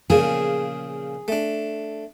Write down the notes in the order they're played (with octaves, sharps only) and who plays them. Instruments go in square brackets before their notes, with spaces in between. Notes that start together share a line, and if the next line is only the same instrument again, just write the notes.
[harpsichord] A#2 C#3 F3 [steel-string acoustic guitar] G#4
[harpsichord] A3 D4